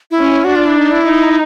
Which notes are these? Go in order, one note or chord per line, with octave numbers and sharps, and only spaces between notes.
E4
C#4
F#4
D4
F4
E4
D#4
E4
D#4